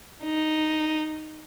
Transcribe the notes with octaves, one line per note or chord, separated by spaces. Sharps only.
D#4